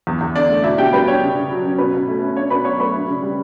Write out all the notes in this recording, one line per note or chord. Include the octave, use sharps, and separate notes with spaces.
E2
E2
D3 D4 D5
A3
B2 E4 E5
B2 G4 G5
G3 B4 B5
D4 C#5
C#3
C#3
F#3
C#4
B2 B4
B2
A3
C#4
D4 C#5
B2 B4 B5
F#3 C#5 C#6
A3 B4 B5
D4
C#3
G3